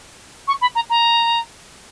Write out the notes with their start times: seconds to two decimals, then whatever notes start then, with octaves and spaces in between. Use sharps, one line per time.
0.47 C#6
0.61 B5
0.75 A#5
0.89 A#5